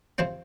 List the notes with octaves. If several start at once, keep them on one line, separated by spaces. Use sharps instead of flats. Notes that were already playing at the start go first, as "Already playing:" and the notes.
C3 F3 C4 C5